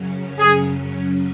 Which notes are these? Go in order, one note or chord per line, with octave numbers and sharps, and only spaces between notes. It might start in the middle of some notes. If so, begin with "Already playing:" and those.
Already playing: F#2 C#3 F#3 C#4
G#4